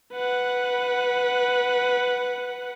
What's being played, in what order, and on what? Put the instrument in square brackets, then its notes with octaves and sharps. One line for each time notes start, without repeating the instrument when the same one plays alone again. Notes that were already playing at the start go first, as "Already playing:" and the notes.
[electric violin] B4 F#5